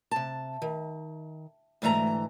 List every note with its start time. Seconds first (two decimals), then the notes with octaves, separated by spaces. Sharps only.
0.11 C3 A5
0.62 D#3
1.82 D2 G#2 E3 A3 A#5